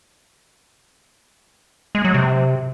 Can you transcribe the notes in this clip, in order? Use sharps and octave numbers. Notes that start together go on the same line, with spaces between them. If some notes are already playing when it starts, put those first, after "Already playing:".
G#3
F#3
C3